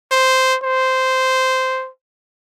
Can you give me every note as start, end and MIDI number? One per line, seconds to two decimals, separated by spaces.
0.12 0.57 72
0.63 1.89 72